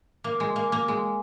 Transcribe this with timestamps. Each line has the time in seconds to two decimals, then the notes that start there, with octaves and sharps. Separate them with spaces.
0.24 A#3
0.40 G#3
0.56 A#3
0.72 A#3
0.88 G#3